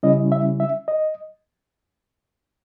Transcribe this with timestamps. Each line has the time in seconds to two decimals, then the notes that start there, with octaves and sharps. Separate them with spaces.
0.03 C#3 G3 C#4 E4 D#5
0.32 E5
0.60 E5
0.88 D#5